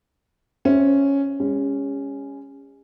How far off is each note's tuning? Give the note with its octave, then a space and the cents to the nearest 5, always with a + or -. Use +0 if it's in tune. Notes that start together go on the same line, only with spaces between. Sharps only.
C#4 +0 C5 +10 E5 +0
G#3 -40 C#4 +0